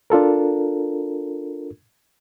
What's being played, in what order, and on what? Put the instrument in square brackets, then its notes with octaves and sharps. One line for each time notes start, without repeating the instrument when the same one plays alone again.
[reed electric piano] D4 F4 A4 A#4